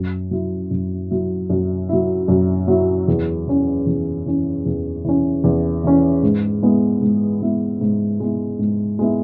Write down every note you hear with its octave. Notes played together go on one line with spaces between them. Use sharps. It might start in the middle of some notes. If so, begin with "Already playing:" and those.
Already playing: F#2
F#3 E4
F#2
F#3 E4
F#2
F#3 E4
F#2
F#3 E4
E2
E3 C#4
E2
E3 C#4
E2
E3 C#4
E2
E3 C#4
G#2
G#3 B3 E4
G#2
G#3 B3 E4
G#2
G#3 B3 E4
G#2
G#3 B3 E4